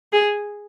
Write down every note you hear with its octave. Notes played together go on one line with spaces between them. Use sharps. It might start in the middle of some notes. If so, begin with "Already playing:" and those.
G#4